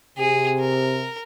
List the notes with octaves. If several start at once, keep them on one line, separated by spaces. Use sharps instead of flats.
C3 G#4
A#4